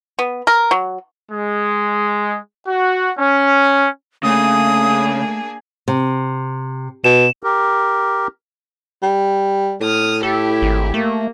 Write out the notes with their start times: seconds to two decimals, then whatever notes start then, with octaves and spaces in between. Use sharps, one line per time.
0.19 B3
0.47 A#4
0.71 F#3
1.31 G#3
2.66 F#4
3.16 C#4
4.23 C#3 A3 A#3 D4 G#4 D#6
5.88 C3
7.04 B2 E7
7.43 G4 A#4
9.03 G3
9.81 A2 D#6 F6
10.23 E4 G4 A4
10.62 G#1
10.94 A3 A#3